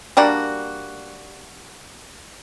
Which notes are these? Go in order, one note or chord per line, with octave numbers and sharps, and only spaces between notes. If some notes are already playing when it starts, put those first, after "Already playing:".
G3 A#3 D4 F#4